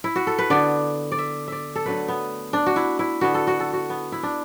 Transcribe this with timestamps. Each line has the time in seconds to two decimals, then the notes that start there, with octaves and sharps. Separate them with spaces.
0.04 E4
0.16 F#4
0.27 A4
0.38 B4
0.50 D3 B3 D5
1.12 D5
1.18 E5
1.48 D5 E5
1.75 A4
1.86 D3 F#3 A3 B4
2.08 B3
2.53 D4
2.66 F#4
2.76 E4
2.99 E4
3.21 D3 B3 F#4
3.34 A4
3.47 F#4
3.60 A4
3.73 F#4
3.90 B3
4.12 E4
4.23 D4